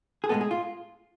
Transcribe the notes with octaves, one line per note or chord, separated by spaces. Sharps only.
G#4
A2 G#3 B3 A4
G#4
F4